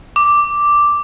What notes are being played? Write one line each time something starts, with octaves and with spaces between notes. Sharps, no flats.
D6